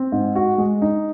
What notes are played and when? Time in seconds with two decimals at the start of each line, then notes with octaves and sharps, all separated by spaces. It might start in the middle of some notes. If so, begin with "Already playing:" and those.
Already playing: C4
0.12 G#2
0.35 F#4
0.58 G#3
0.82 D#4